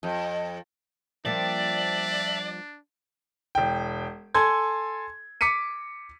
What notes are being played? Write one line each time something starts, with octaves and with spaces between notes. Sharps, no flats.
F2
F3 G3 A#3 D4 D5 E5 A5
E1 G5
A4 G#5 C6 G#6
D6 B6 C#7 D#7